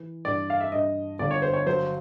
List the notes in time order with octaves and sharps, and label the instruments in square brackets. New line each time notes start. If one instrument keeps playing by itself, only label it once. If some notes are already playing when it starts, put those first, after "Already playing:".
Already playing: [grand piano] E3
[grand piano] G2 [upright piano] D5
[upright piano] F5
E5
[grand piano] G2 [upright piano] D#5
[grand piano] G1 [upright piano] D5
[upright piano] C#5
C5
C#5
[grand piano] F#3 [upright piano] C5